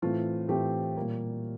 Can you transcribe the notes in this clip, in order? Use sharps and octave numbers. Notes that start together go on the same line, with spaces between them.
A2 E3 A3 C4 F4
A2 E3 A3 C4 G4
A#2 G3 A#3